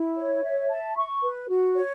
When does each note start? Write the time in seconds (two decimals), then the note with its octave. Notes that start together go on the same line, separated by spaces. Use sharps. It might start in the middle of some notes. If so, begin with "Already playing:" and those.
Already playing: E4
0.17 C#5
0.44 E5
0.69 A5
0.97 C#6
1.23 B4
1.50 F#4
1.76 C#5